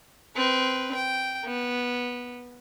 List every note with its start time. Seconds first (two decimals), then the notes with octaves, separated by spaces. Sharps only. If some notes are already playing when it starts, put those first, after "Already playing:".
0.36 C4 B4
0.94 G5
1.45 B3